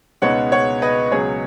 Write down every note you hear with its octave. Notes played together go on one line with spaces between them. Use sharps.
C#2 B2 G#3 B3 D#4 C#5 F#5
C#5 F#5
B4 D#5
C#2 B2 F#3 G#4 C#5